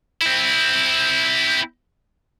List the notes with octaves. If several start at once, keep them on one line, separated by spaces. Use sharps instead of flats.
C4 E4